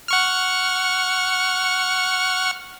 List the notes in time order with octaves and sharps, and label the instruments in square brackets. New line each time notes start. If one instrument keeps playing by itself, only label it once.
[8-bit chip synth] F#5 C#6 F6